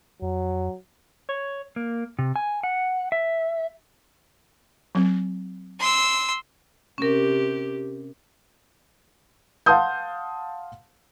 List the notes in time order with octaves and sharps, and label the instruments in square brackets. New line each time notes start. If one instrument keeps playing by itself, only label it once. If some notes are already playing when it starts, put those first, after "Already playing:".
[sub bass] F2 [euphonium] F#3
[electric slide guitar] C#5
A#3
C3
G#5
F#5
E5
[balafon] F#3 C4
[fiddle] C6 E6
[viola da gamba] C3 G4 [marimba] C#4 A#4
[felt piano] F5 F#5 A5 C6 D#6 G6